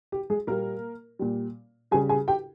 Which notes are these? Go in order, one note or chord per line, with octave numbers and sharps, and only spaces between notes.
G4
G#3 G#4
A#2 G3 A#3 A#4
A#2 G3
C#3 G3 G#4 G#5
G#4 G#5
G4 G5